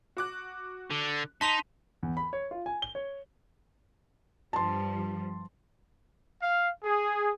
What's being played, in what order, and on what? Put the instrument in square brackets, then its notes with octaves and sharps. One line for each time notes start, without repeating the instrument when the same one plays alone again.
[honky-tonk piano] F#4 D6 F#6
[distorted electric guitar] D3
[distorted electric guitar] D#4 [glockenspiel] A5 C6 F7 [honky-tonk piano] B6 D#7
[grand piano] E2
B5
C#5
F4
G#5
G7
C#5
[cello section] G2 F3 G3 [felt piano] A5 C6
[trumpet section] F5
G#4